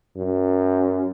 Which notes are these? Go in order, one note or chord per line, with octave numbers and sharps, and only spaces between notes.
F#2